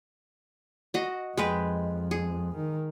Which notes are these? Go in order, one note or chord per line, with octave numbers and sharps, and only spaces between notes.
F#4 D#5
F2 G#3 B4 G5
G#4
D#3